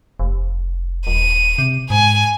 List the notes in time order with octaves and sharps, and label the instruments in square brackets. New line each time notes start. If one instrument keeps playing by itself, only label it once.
[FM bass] F1
[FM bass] D#1 [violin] D#7
[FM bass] C3
[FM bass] G#2 [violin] G#5